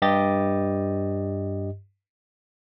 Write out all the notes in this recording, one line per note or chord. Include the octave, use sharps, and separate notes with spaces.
G2 G4 D#5 A6